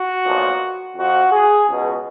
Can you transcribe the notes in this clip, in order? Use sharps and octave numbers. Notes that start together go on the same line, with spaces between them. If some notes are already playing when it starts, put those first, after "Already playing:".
Already playing: F#4
B1 A#2 F3
F2 F3 F#4
G#4
C#2 B2